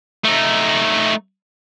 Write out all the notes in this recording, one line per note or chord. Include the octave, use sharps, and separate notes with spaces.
A3 D#4